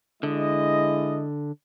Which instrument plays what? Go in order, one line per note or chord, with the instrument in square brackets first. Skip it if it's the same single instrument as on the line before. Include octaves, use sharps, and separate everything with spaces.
[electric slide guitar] D3 [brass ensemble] G#3 E4 D#5